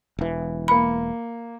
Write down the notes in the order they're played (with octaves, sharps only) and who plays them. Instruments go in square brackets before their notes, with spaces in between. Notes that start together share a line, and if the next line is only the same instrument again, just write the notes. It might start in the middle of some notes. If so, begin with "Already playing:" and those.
[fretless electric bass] E1 E3
[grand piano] A#3 C#7 [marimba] B5